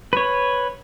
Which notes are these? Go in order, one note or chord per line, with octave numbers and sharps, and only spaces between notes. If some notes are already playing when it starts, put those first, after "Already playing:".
B4 C#5